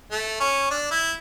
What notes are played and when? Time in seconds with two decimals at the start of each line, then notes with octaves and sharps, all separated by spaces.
0.11 A3
0.40 C#4
0.71 D4
0.91 E4